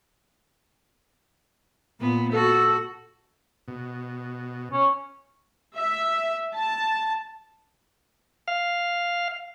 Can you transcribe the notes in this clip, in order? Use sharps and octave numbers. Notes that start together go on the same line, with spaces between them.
A#2 B3
F#4 A4
B2
C#4
E5
A5
F5